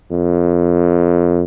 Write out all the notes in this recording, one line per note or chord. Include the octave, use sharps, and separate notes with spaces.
F2